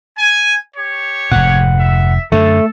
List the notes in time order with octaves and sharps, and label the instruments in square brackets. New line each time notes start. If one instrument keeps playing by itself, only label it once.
[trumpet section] G#5
G4 C#5
[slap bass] F1 G#2 [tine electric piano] F#5
[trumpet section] E5
[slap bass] F#2 D3 [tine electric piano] A3 [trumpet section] A4